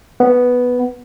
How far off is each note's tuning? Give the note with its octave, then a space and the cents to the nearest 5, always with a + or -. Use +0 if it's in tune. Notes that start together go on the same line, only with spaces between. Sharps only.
B3 +0